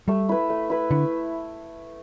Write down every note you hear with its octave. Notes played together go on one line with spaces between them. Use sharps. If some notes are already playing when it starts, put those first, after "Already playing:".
G3 A3
E4 B4
A3
E4 B4
D3 E4